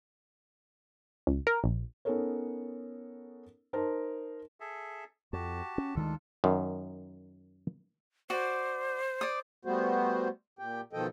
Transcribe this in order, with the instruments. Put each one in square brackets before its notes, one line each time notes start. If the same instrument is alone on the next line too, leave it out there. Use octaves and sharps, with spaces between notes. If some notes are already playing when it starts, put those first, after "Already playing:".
[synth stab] C#2
A#4
A#1
[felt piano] B3 C#4 D#4 A4 A#4 C#5
D#4 A#4 C5 A5
[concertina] G#4 A4 E5
[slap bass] F2 [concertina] F#4 G4 A5
[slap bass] C#4
[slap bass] D2 D#3 G#3 [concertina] D4 F4 A4
[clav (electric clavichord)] F#2 D#3
[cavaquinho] F#4 D5 [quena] C5
[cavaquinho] D5 D#6
[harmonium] G3 A3 B3 F#4 C5
A#2 G4 G5
B2 D#3 F3 A4 D#5 G5